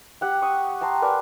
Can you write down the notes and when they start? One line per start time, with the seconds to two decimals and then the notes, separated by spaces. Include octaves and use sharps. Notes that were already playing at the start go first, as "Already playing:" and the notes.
0.21 G4 F#5 G5
0.42 C#6 D#6
0.81 G5 A5 A#5 C6
1.02 A#4 B4 D5 G#5